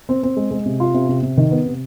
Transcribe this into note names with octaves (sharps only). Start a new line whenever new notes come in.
C4
C4
G#3
G#3
C3
F4
C3
C3
C3
D#3
B3
C3